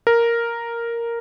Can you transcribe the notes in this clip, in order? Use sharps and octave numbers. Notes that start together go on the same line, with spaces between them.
A#4